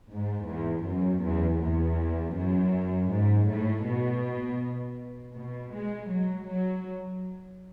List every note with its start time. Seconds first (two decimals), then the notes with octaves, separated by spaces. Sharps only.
0.10 G#2
0.47 E2
0.85 F#2
1.23 E2
1.60 E2
2.35 F#2
3.10 G#2
3.48 A2
3.86 B2
5.35 B2
5.73 G#3
6.11 F#3
6.48 F#3